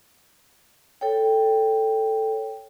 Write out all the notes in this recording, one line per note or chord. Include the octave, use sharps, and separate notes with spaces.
A4 C#5 G5